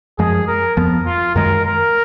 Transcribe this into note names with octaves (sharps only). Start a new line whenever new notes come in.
F#2 F3 G#3 G#4
A#4
F2 F3 B3
F4
F#2 D#3 G#3 A#4
A#4